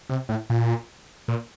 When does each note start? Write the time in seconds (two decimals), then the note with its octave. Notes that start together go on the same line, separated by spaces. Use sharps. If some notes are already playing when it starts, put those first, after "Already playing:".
0.10 C3
0.29 A2
0.50 A#2
1.28 A#2